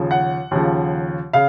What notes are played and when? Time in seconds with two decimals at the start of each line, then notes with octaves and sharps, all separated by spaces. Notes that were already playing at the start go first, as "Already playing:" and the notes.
Already playing: D#2 C#3 F3
0.11 F#5
0.51 D#2 C#3 F3
1.33 C#3 F5